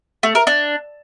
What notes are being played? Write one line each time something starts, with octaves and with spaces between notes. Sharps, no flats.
A3
A#4
D4